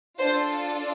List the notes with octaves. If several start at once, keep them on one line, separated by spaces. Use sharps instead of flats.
D4 F4 A4 C5